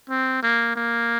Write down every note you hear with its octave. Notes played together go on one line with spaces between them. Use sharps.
C4
A#3
A#3